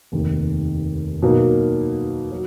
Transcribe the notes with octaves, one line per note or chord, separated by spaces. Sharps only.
F1 D#2 D#3
B2 F#3 A#3 D#4
F#3